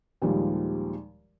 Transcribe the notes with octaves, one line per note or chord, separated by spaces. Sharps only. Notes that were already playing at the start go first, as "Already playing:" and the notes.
D#2 A#2 D#3 F3 G3 G#3